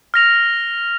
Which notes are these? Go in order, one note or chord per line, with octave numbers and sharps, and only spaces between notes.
F6 A#6 F7